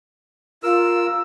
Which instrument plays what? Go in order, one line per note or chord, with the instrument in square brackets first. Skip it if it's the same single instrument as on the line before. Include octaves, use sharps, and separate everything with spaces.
[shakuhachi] F4 [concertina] A#4 E6